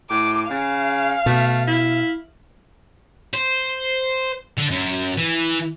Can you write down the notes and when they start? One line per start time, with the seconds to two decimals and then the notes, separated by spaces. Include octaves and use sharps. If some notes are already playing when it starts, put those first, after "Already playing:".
0.11 A2 D6
0.51 C#3 F5
1.26 B2 A3
1.68 E4
3.34 C5
4.58 D3
4.71 F#2
5.17 E3